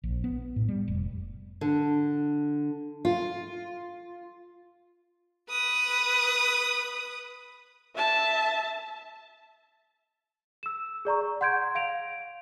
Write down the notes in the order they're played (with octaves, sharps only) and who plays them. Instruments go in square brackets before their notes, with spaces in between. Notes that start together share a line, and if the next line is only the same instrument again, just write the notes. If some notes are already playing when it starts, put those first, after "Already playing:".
[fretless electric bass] A#1
B3
A2
G3
F1
[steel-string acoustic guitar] D3
F4
[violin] B4 D#6
[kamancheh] E5 A5
[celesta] E6 E7
G#4 D5 A#5 C#6
D5
F#5 C6 G6 G#6 D7
F5 D7 F7